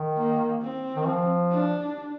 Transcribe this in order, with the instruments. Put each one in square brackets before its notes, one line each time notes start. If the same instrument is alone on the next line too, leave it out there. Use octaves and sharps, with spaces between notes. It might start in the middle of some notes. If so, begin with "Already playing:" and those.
Already playing: [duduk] D#3
[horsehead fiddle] A#3
C4
[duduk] D#3
F3
[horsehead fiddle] D4